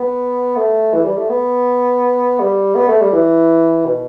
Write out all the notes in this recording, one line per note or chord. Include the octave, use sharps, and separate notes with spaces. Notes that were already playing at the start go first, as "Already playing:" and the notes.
Already playing: B3
A3
E3
G3
A3
B3
G3
B3
A3
G3
E3
B2